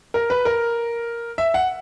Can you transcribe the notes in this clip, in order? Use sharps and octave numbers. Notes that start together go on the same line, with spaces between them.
A#4
B4
A#4
E5
F#5